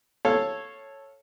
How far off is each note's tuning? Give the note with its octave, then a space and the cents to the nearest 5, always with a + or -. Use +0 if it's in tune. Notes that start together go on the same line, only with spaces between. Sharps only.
A4 +0 C#5 -10 F5 +0